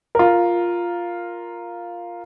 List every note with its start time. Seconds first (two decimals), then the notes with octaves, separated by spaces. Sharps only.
0.15 F4 A#4